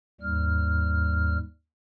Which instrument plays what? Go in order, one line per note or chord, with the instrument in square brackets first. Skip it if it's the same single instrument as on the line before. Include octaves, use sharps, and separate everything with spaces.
[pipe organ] D#2 G#2 G3 F6